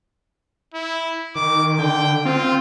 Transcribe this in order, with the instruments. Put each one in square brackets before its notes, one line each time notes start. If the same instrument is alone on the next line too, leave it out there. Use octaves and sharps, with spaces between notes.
[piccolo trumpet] E4
[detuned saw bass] D#3 [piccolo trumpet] D6
[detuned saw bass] D3 [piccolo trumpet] G5
[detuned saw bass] C4 [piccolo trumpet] F4